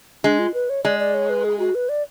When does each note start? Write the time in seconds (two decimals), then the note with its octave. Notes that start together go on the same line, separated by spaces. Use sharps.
0.24 G#3 D4
0.39 F4
0.54 B4
0.70 C#5
0.84 G#3 D5
0.99 D5
1.14 C#5
1.30 B4
1.45 G#4
1.59 F#4
1.75 B4
1.89 D5